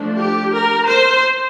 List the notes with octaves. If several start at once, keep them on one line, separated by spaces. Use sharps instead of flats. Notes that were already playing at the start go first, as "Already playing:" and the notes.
Already playing: F3 A3 D4
G4
A#4
C5